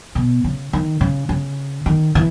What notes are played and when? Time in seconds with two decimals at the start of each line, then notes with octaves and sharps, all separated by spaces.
0.15 B2
0.44 C#3
0.73 D#3
1.01 C#3
1.29 C#3
1.86 D#3
2.15 E3